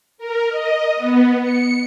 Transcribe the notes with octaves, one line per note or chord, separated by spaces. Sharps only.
A#4
D#5
B3
C#7